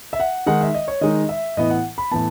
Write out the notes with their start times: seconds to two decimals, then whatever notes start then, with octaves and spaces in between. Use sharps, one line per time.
0.13 E5
0.20 F#5
0.46 D#3 G#3 D#4 F#5
0.61 E5
0.74 D#5
0.88 C#5
1.01 D#3 G#3 D#4 D#5
1.29 E5
1.57 A2 E3 B3 D#5
1.70 F#5
1.98 B5
2.11 A2 E3 B3 A5